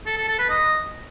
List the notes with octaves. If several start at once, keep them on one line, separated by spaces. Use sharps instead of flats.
A4
A4
A4
B4
D#5